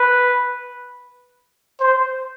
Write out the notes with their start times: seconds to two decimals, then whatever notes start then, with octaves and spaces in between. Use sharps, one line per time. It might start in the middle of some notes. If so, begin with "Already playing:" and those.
Already playing: B4
1.80 C5